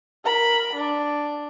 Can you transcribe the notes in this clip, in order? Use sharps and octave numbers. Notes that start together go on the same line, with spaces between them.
A#4 B5
D4